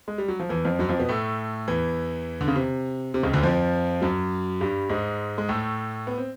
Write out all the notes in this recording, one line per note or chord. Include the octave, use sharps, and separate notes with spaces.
G#3
G3
F#3
F3
E2 E3
F2 F3
F#2 F#3
F2 F3
B2 B3
A2 A3
E2 E3
D3
C#3
C3
C3
C#2 C#3
D2 D3
F2 F3
F#2 F#3
G2 G3
G#2 G#3
G#3
A2 A3
B3
C4